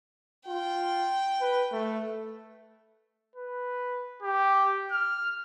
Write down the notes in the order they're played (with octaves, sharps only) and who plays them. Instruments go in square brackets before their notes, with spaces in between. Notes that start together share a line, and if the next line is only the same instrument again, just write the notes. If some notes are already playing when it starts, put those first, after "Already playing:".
[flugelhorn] F4 [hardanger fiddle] G5
[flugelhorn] B4
A3
[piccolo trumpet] B4
G4
F6